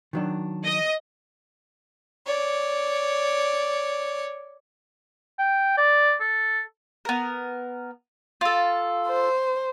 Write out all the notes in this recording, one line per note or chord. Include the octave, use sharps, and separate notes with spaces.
D#3 F#3 D4
D#5
C#5 D5
G5
D5
A4
B3 A#4
F4 A4
C5